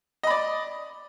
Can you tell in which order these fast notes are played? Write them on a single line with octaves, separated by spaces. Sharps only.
D#5 B5 D5